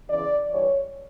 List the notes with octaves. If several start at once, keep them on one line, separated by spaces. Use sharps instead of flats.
E2 C#3 E3 D5
G2 E3 C#5